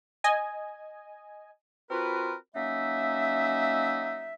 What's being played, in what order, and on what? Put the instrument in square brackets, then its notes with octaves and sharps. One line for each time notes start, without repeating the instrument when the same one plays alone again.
[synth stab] D#5 G#5
[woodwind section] C4 F4 F#4 A#4 B4
F#3 A#3 C#4 D#4 E5